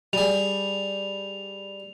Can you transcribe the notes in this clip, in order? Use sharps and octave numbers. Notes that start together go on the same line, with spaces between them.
G3 G#4 F7